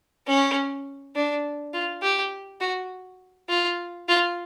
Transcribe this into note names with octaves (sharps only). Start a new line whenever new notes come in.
C#4
D4
F4
G4
F#4
F4
F4